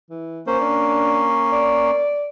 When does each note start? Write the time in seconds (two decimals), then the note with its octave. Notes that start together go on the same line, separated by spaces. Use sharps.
0.10 E3
0.47 A#3 C#4 C5
0.60 D4
1.52 D5